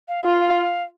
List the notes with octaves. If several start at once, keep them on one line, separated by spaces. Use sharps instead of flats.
F5
F4 F5
F5